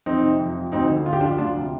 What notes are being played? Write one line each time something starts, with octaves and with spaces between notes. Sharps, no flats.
F2 C4 D#4
C3
F2
F3
D2 C4 D#4
D3
D2 F4
G4
F3 D4 F4
D2 D4 F4
C3